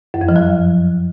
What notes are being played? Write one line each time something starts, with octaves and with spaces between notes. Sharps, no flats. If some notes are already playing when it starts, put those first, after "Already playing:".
F#2
F2
F3
F#3